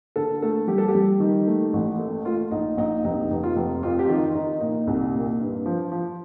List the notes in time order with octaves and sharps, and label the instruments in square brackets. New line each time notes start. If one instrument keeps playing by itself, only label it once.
[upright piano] D3 A4
A3 A4
G3 G4
A4
G4
G3
D#3
A3
A1
A3
A3 F4
A#1 D#4
A#1 D#4
F1 D#4
F1
F4
F1
F2 F4
G4
D#3 F4
D#3 D#4
A#2 D#4
C2
A#2
G2
F3
F3